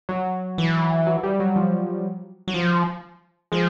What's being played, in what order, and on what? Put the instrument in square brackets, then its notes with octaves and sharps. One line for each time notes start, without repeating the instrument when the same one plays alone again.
[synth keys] F#3
[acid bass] E3
[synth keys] F#3
G3
F#3
F3
[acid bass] F#3
F3
[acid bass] F3 [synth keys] G#3